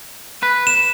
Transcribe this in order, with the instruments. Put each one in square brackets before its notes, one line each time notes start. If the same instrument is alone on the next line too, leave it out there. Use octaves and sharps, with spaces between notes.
[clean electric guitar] B4
[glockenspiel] E7